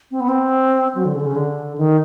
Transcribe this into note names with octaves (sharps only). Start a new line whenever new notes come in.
C4
B3
C4
F#3
D3
C#3
D3
C#3
D3
D#3